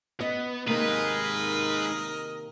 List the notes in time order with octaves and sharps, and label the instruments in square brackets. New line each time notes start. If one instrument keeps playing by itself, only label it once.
[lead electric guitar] B3 [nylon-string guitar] D#5
[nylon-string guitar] C3 D#3 A#3 [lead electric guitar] G#3 D#4 [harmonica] A#4 D#5 [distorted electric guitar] B4